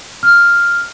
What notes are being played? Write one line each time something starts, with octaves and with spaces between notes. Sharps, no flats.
F6